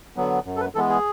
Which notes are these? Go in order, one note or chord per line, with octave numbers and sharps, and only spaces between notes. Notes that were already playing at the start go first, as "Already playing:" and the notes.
D3 F#3 B3
F#2
A4
B4
E3 G#3 B3 A4
G#4